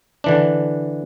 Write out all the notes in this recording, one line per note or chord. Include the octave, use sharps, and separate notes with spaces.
D3 E3 D4